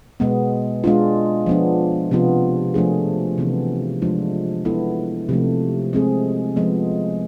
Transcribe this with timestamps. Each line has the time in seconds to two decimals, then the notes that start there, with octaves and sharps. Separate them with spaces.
0.20 B2 G#3 B3
0.84 G#3 D4 F4
1.46 F3 B3 D4
2.11 C3 F3 B3 F4
2.74 F3 A3 D4 G#4
3.38 C3 E3 B3
4.02 F3 G#3 D4 F4
4.65 G#3 B3 E4 A4
5.29 C3 F3 A3
5.93 G#3 C4 G#4
6.56 F3 G#3 B3